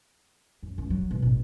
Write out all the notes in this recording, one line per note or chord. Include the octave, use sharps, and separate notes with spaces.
F#2
C#2
F#3
B2
A1